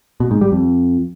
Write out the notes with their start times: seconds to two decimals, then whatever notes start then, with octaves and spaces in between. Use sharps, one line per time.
0.20 B2
0.31 G#2
0.41 G3
0.52 F2